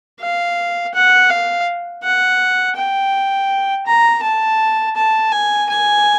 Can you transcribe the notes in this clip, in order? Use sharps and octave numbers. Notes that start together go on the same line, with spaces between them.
F5
F#5
F5
F#5
G5
A#5
A5
A5
G#5
G#5